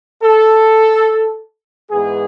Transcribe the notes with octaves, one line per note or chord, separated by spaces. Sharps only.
A4
G#2 E3 B3 G#4